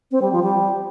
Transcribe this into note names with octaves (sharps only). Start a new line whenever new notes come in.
C4
G3
F3
G3